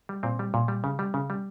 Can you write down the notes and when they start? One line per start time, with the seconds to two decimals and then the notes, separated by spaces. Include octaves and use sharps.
0.09 G3
0.23 A#2 C4
0.39 G3
0.54 A#2
0.68 G3
0.84 C#3
0.99 G3
1.14 C#3
1.30 G3